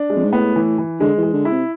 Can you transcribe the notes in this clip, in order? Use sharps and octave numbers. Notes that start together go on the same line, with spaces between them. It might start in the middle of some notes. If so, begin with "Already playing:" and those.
Already playing: D4
G#3
F2
G#2
A2 B3
E3
E3
D3 G#3
E3 G#3
D3
E4
C3